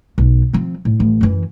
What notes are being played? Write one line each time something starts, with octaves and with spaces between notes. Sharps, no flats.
B1
F3 C4
A2
A1
F#2 E3